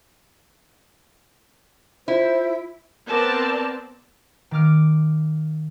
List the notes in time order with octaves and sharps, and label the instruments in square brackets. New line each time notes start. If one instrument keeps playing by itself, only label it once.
[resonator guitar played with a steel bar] E4 [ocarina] F4 [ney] C5
[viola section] B3 C4 A#4 D5 A5
[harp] D#3 A#3 D6 F6 D7